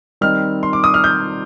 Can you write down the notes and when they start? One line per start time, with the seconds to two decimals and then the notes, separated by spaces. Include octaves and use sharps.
0.21 D#3 G3 C4 D#4 F6
0.63 C6
0.73 D6
0.84 D#6
0.94 F6
1.04 G6